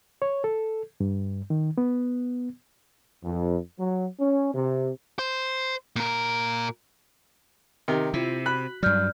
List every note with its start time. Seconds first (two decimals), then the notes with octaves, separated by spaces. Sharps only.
0.22 C#5
0.44 A4
1.00 G2
1.50 D#3
1.78 B3
3.24 F2
3.79 F#3
4.20 C#4
4.54 C3
5.19 C5
5.96 A#2 A#4
7.88 C3 D#3
8.14 C3 E4 F4
8.46 F#4 B5 F#6
8.83 G2 F#3 D5 F6 G6